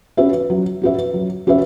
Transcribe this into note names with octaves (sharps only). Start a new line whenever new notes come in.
C#4 F#4 B4 E5
F#3
C#4 F#4 B4 E5
F#3
C#4 F#4 B4 E5